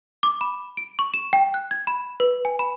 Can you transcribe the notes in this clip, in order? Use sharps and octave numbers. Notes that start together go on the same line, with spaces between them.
D6
B5
D7
C#6
E7
G5
F#6
G#6
B5
B4
G#5
B5